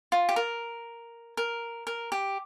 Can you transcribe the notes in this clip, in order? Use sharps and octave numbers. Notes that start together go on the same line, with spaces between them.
F4
G4
A#4
A#4
A#4
G4